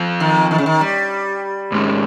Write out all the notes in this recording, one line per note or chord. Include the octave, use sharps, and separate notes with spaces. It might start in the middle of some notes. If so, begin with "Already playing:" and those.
Already playing: F3 C4 F4
D#3
D#3
C#3
D#3
G3
G#2 D#3 G#3 C#4